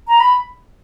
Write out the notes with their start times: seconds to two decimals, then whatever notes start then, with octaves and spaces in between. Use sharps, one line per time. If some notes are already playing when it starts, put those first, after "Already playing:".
0.08 A#5
0.20 B5